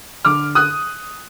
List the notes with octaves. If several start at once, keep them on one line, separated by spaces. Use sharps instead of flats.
D3 D6 F6
D#6 F#6